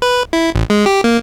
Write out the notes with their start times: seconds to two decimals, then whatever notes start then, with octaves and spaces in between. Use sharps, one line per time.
0.02 B4
0.33 E4
0.55 A1
0.70 G#3
0.86 G4
1.04 A#3